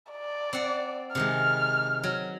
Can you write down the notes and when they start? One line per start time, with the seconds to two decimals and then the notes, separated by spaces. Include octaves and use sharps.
0.12 D5
0.53 C4 F#5
1.15 C3 D#3 G#3 F6
2.03 F#3